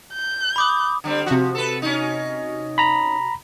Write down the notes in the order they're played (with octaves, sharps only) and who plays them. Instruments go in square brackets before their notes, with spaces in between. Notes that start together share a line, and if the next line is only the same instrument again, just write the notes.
[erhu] G6
[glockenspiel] B5 D6 D#6
[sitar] D3 G3 C4
[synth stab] C3 F#4 [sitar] F3
[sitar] A4 B4
C#4 D#4
[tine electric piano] A#5 B5